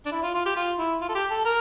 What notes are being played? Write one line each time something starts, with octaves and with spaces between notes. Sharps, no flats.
D4
E4
F4
F4
G4
F4
E4
F4
A4
G4
A4
A#4